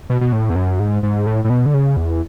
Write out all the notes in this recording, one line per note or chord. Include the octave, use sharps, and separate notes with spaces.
B2
B2
A2
E2
F#2
G#2
G#2
A2
A2
B2
D3
C#3
E2